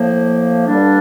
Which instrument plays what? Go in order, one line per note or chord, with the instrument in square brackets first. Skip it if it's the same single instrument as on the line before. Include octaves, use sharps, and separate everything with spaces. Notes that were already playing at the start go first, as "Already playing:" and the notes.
Already playing: [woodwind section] A2 F3 A#3
G2 D3 G3 A#3 D4